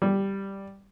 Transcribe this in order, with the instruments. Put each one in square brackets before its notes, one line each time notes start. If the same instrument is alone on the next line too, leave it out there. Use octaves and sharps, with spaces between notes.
[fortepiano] G3